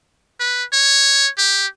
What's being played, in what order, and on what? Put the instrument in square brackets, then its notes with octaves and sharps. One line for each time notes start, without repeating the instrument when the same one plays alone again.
[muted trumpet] B4
C#5
G4